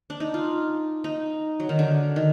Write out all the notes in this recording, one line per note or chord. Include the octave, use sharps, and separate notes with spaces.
D4
D#4
F4
D#4
F#3
D#3
D3
D#3